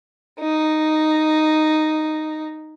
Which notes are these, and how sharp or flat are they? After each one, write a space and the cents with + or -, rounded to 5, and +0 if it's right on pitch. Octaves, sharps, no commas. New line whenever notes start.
D#4 -5